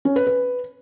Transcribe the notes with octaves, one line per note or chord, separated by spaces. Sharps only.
C#4
B4
B4